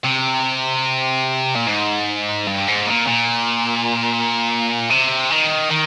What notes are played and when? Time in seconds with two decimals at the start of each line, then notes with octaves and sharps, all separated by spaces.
0.05 C3
1.56 A#2
1.67 G#2
2.47 G2
2.68 G#2
2.87 A#2
3.08 A#2
4.90 C3
5.30 D#3
5.71 D#3